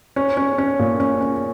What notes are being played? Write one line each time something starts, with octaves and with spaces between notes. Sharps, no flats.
C#4
C#4
C#4
A#2
C#4
C#4